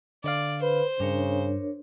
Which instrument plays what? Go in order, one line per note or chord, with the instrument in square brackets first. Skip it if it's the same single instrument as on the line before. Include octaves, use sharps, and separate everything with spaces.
[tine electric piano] D3 F5 [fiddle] D5
[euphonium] B4 [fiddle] C5
[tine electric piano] G2 [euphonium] C#3 [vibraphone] D4 A#4 C#5